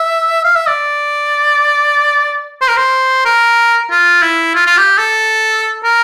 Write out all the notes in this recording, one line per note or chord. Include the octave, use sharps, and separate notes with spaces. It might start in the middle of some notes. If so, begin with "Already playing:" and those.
Already playing: E5
F5
E5
D5
C5
A#4
C5
A#4
F4
E4
F4
F4
G4
A4
A#4